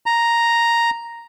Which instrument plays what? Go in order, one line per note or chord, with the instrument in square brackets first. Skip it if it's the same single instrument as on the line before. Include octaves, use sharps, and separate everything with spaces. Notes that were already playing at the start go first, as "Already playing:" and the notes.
[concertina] A#5